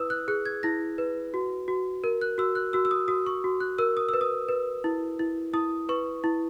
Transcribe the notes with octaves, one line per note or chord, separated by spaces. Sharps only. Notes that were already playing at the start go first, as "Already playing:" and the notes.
Already playing: E4 B4 D#6 E6
F#6
G#4 F#6
G#6
E4 A#6
B4
F#4
F#4
A#4
F#6
F#4 E6
F#6
F#4 E6
E6
D#6
F#4 D#6
C#6
F#4
F#6
A#4 E6
D#6
B4 E6
D#6
B4
E4
E4
E4 D#6
B4 C#6
E4